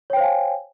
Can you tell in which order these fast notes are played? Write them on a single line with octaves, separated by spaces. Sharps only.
C#5 G5 C5 F5 G#5